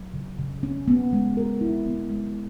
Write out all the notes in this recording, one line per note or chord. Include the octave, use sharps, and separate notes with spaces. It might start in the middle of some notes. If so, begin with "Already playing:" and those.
Already playing: F#3
C#3
C#3
C#4
B3
G#3
A#4
E4
B3
G#3